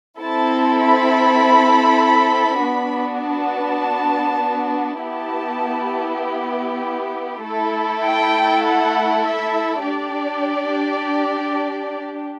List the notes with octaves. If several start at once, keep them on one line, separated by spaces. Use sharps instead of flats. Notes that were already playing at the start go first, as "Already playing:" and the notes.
C4 E4 A4 A5
B5
B3 D4 F#4
A5
B3 E4 G4 A5
A3 E4 A4
G5
F#5
E5
D4 G4 D5